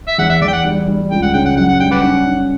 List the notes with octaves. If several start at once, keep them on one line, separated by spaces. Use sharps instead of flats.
E5
E2 F#5
E5
E2 D5
G5
F#5
G3
G3
C#2 G5
F#5
C#3 G5
F#5
F#2 F#5
F#5
G3 G5
B4 D5 F#5
C#4
C#4